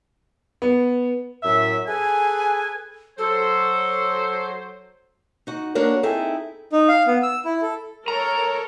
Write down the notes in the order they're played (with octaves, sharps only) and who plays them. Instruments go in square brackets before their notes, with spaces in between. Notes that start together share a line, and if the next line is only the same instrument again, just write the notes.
[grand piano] B3
[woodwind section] F#2 A2 E5
G#4 A4 B4 G#5
[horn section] F#3 C5 [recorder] A4
[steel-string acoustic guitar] D#4 F#4
A#3 D4 F#4 A#4 C#5
C4 D#4 E4 G#4 A4
[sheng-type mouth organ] D#4
F5
B3
E6
E4
A4
[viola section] A4 A#4 C#5 [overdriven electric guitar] A#5